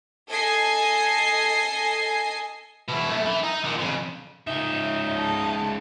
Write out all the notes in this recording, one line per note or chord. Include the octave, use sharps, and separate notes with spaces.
A4 D#5 G#5 C7
B2 E4
F#2 A3
E3 E4
D#4
A#2 D3
F2 C#3
C#2 D#4 E5
A5